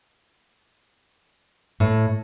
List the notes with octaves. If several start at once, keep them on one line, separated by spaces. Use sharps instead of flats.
A2